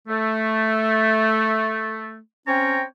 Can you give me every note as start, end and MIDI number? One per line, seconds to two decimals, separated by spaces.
0.08 2.18 57
2.47 2.82 60
2.47 2.82 61
2.47 2.82 73
2.47 2.82 79
2.47 2.82 82